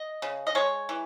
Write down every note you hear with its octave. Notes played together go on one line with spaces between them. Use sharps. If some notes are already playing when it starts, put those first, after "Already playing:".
Already playing: D#5
C#3
D#5
G#3 C#5
E3